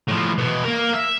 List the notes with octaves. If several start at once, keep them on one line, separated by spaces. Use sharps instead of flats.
A2 F3
B2 E3
A#3 A#4
E5